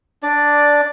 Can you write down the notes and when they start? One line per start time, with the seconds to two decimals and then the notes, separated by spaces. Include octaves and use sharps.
0.23 D4 D5